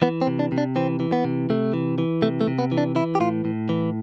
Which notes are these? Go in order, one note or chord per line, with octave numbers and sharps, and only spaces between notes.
E3 B3
C4
C3
D4
C3
D4
E3 C4
E3
B3
C3
C3 A3
E3
E3
C3 A3
A3
C3
B3
E3
D4
E3 E4
G4
A2 F4
A2
E3